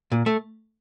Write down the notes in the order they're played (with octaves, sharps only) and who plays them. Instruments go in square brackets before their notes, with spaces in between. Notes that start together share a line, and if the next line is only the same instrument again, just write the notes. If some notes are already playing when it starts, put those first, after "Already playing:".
[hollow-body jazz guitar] A#2
A3